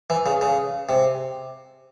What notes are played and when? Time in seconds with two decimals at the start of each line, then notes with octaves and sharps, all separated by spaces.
0.10 E3
0.26 C#3
0.41 C#3
0.89 C3